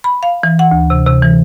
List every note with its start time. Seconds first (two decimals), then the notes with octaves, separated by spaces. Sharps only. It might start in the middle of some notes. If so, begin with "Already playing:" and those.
0.04 B5
0.23 F5
0.43 E3
0.59 F#5
0.71 D2
0.90 C3
1.07 C3
1.23 E3